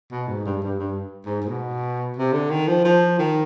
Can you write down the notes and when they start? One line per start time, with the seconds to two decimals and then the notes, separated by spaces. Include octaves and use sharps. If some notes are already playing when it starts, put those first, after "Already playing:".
0.11 B2
0.28 G#2
0.46 G2
0.63 G2
0.80 G2
1.26 G#2
1.42 G#2
1.48 B2
2.17 C3
2.33 D3
2.50 D#3
2.68 F3
2.85 F3
3.19 D#3